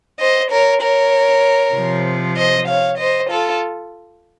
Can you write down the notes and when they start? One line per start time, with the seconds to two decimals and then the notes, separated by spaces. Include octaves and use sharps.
0.20 C5 D#5
0.51 A#4 C#5
0.82 A#4 C#5
1.75 C3 F3
2.37 C5 D#5
2.69 C#5 F5
2.99 C5 D#5
3.31 F4 A4